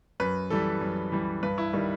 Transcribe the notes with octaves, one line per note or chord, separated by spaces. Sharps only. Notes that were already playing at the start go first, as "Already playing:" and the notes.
F#2 B4
E3 G3 A4
F#2
E3 G3
G2 B4
E4
D#3 G3